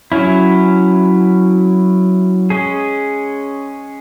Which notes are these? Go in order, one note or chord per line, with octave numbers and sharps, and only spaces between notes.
F#3 C#4 E4
G#3 C#4 G#4